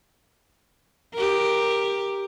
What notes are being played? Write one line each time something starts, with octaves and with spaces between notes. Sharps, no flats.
G4 A#4